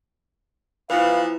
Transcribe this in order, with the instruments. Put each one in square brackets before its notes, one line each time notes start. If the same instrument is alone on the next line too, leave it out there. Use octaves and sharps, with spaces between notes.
[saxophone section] E3 F3 B3 [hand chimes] E4 B4 [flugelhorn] F5